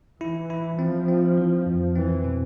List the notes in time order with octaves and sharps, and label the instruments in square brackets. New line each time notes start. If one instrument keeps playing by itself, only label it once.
[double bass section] E3 [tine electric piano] E4
[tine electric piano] E4
[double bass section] F3 [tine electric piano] C4
[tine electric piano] C4
E3
F2
[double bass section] E3 [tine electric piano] C4
[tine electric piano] B2